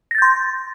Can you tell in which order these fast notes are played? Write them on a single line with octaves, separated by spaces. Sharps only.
A#6 A6 G6 C6